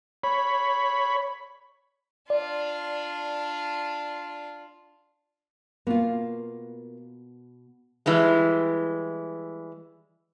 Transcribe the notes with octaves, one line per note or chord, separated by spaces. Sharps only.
C#5 B5
D4 F4 D5
B2 A#3 B3 F4
E3 G3 G#3